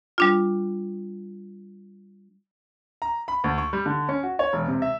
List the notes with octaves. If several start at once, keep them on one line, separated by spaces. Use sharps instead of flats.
G3 D4 F4
A#5
B5
D2
C#6
G3
D3
C#4
F#4
C#5
E1
C3
E5